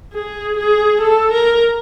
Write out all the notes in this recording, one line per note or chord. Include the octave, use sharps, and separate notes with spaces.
G#4
G#4
A4
A#4